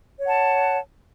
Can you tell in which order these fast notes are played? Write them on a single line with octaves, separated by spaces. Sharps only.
C#5 F#5 A5